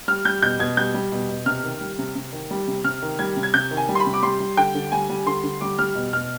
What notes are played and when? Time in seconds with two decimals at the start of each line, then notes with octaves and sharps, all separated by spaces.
0.08 G3 F6
0.25 G3 G6
0.42 B2 G6
0.59 B2 G#6
0.77 G3 G6
0.94 G3
1.12 B2
1.29 B2
1.46 C3 F6
1.64 D#3
1.81 G3
1.98 C3
2.15 C3
2.32 D#3
2.51 G3
2.68 C3
2.84 C3 F6
3.02 D#3
3.19 G3 G#6
3.36 C3
3.43 G#6
3.54 C3 G6
3.71 D#3
3.77 G#5
3.89 G3
3.95 C6
4.00 B5
4.06 C3
4.14 D6
4.23 G3 C6
4.40 G3
4.57 D3 G5
4.75 D3
4.92 G3 G#5
5.09 G3
5.26 D3 C6
5.44 D3
5.61 G3 D6
5.79 G3 F6
5.95 B2
6.13 B2 F6